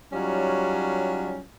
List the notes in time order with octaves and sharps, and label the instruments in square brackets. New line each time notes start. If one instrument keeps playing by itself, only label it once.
[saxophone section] F#3 G3 C#4 D#4 F4